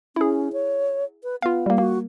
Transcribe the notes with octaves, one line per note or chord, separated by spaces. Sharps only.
C#4 E4 G#4
C#5
B4
B3 F4 F5
G3 A#3
A#3 F#4